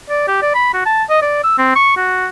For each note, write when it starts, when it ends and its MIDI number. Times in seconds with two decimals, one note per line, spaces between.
0.10 0.24 74
0.28 0.41 67
0.42 0.52 74
0.55 0.72 83
0.74 0.85 66
0.86 1.04 81
1.10 1.22 75
1.22 1.40 74
1.44 1.54 88
1.58 1.73 60
1.75 1.95 85
1.97 2.28 66